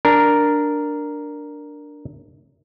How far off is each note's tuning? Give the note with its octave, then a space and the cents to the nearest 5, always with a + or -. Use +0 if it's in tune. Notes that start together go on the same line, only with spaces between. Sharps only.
D4 +0 A#4 +0